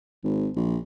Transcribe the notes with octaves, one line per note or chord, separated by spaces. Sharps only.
G#1
A#1